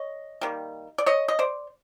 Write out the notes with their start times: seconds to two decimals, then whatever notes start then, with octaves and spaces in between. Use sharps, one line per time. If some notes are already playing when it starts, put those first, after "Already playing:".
Already playing: C#5 D#5
0.41 D#3 G3 A#3
0.98 D5
1.06 C#5 D#5
1.28 D#5
1.39 C5 D5